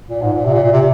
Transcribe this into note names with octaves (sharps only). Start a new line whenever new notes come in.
A#2
G#2
A#2
C3
A#2
A#2
C3